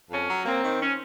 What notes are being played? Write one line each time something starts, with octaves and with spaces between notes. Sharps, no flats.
F2 C#4
F#3
A#3 C4
D#3
C#4